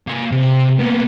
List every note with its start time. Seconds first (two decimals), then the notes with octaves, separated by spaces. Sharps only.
0.07 A#3 G#5
0.32 C3
0.79 A#3 B3